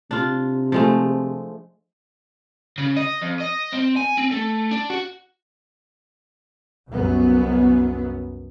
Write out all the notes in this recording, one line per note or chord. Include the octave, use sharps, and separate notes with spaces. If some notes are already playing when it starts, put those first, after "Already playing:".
C3 D4 F4
F3 G#3 A3
C#3
D#5
F2
D#5
C4
G#5
C4
A3
D4
F#4
C2 F#2 B3